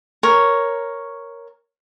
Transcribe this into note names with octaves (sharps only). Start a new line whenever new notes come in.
A#4 C#5